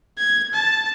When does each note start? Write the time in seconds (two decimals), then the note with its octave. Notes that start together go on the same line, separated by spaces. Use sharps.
0.18 G#6
0.53 A5